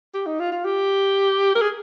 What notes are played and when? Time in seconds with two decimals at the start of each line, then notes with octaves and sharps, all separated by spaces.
0.14 G4
0.26 D#4
0.40 F4
0.52 F4
0.65 G4
1.55 A#4
1.62 G#4